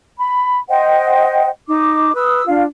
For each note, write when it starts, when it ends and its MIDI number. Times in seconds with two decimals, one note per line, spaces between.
0.17 0.58 83
0.69 1.49 72
0.69 1.49 75
0.69 1.49 78
0.69 1.49 79
1.68 2.12 63
1.68 2.12 86
2.14 2.45 71
2.14 2.45 87
2.14 2.45 88
2.47 2.64 62
2.47 2.64 65
2.47 2.64 77